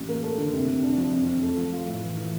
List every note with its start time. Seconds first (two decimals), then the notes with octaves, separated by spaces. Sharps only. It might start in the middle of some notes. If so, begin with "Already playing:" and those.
Already playing: A1
0.08 A#3
0.23 A3
0.38 D3
0.53 C3
0.68 C3
0.83 D4
0.97 F3
1.13 F2
1.28 F2
1.43 A3
1.57 F3
1.73 F4
1.88 A2
2.03 E3
2.17 E3